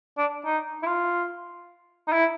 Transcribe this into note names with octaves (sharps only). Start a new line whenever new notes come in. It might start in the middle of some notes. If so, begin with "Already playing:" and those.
D4
D#4
E4
F4
D#4
E4